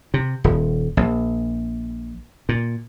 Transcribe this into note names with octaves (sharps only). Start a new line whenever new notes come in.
C3
D#1
A#1
A#2